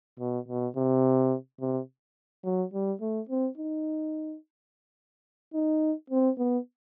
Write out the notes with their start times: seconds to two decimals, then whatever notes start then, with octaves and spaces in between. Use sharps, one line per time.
0.19 B2
0.48 B2
0.76 C3
1.60 C3
2.44 F#3
2.73 G3
3.01 A3
3.29 C4
3.58 D#4
5.54 D#4
6.10 C4
6.38 B3